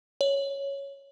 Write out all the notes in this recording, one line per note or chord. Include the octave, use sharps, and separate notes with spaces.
C#5